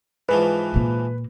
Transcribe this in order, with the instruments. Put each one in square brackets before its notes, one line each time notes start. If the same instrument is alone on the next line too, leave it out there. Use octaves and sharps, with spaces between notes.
[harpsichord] G#2 E3 F3 [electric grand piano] B4
[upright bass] A#2 A#3